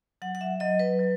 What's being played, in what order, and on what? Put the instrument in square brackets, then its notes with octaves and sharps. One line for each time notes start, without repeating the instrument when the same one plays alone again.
[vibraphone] F#3 F#5
F#5
E5
F#3 D#5
B4
F#3